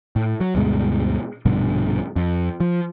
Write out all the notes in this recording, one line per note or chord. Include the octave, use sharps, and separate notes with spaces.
A2
F#3
D2 G2 B2 G#3
A#1 G2 B2 D3
F2
F3